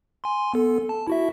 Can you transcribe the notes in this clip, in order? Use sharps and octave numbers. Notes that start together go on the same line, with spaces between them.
G#5 C6
B3 A4
A5
E4 F#4 E5